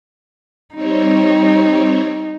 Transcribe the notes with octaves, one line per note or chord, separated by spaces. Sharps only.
G3 C4 D#4 C#5